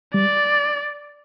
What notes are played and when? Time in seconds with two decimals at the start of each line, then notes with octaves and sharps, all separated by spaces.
0.14 G3 D5